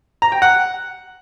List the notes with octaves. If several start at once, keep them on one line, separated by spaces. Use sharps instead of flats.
A#5
G5
F#5